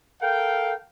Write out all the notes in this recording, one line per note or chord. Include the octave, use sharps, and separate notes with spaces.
A4 A#4 F5 G5